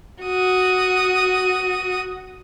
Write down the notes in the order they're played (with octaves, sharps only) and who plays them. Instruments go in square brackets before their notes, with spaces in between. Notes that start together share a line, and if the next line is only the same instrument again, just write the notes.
[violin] F#4 D#6